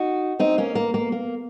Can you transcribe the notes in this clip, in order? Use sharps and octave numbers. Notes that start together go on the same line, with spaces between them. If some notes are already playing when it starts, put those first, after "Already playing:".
Already playing: D#4 F#4
C4 D#4
A#3 C#4
A#3
A#3
A#3